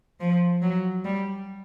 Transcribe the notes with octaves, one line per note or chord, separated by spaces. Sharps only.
F3
F#3
G3